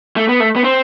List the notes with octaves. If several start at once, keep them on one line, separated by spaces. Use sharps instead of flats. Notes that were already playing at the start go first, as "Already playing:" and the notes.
A3
B3
A3
B3
C4